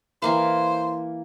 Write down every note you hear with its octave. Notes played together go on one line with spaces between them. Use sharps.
E3 A#3 C5 F5